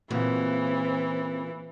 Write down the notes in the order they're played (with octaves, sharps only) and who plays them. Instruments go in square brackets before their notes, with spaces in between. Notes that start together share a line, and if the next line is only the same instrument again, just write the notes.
[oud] A#2 C#3 F#4 [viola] E3 [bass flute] C4